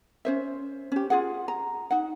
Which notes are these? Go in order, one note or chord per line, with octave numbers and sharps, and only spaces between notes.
C#4 C5 E5
C#4 G4
F4 G#4 F#5
A#5
D#4 F#5